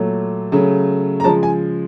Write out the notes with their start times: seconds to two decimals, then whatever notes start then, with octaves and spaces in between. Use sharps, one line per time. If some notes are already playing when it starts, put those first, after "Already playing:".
Already playing: A#2 F#3 A3
0.52 C#3 F#3 A3
1.20 A#5
1.24 C#3 F3 G#3 A5
1.43 G#5